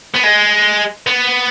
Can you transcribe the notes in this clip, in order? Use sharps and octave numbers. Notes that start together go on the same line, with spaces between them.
B3
G#3
B3